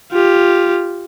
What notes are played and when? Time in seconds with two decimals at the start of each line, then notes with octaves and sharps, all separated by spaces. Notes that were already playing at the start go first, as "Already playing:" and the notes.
0.12 F4 G4